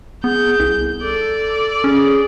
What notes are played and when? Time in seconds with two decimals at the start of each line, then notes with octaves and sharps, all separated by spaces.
0.24 B3 G#4 G6
0.60 C2
1.02 A4 D5
1.84 C#4 G#4